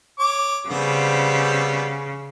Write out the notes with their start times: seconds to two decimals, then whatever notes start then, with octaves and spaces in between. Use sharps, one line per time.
0.20 C#5 D6
0.69 C#3 G3 B3 C4